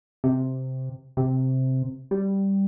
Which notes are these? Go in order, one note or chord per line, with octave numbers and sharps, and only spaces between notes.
C3
C3
G3